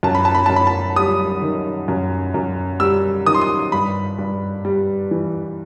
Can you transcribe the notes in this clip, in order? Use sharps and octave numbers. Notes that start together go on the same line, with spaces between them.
F#2 A5
B5
A5
B5
F#2 A5
B5
A5
G3 D#6
D#3
F#2
F#2
G3 E6
D#3 D#6
C6
D#6
G2 B5
G2
G3
E3